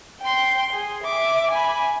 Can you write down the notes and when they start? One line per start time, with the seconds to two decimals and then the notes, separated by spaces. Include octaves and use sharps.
0.21 G5 C6
0.73 G#4
1.03 E5 D6
1.51 G#5 B5